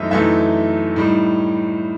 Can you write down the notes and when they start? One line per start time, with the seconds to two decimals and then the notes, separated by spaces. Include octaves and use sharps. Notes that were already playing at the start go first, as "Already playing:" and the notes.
Already playing: F#2 E3 A3 D#4 C5 D#5 E5
0.11 F#2 E3 A3 D#4 E5
0.96 A2 G3 D#4